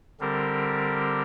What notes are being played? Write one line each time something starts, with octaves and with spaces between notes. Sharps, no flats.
D3 G3 C4 G4 A#4